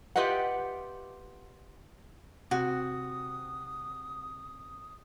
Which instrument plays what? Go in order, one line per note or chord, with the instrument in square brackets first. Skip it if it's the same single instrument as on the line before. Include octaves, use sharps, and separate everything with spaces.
[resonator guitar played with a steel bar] F4 G4 B4 D#5 E5 F#5
[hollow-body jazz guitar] C3 [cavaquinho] F#4 [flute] D#6